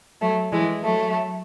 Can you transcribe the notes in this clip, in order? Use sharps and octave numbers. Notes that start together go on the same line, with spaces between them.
F#3 A3
E3 G#3
F#3 A3